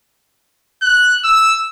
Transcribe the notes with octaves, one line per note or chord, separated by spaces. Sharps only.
F#6
E6